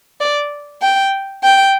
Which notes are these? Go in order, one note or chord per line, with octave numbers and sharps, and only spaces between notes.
D5
G5
G5